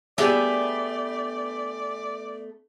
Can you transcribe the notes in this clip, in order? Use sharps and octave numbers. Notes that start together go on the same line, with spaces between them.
A3 B3 D4 G4 G#4 D5 E5